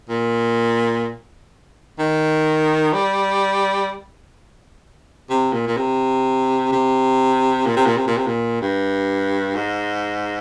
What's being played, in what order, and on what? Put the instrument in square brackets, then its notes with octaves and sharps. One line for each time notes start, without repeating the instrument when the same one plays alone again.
[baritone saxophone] A#2
D#3
G3
C3
A#2
A#2
C3
C3
A#2
C3
A#2
C3
A#2
C3
A#2
G2
G#2